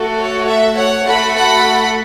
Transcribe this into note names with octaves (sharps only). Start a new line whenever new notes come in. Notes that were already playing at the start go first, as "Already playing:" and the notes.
Already playing: A3 F#4 A4
C#5
E5
C#5 F#5
A3 F#4 A4 F#5 B5
F#5 B5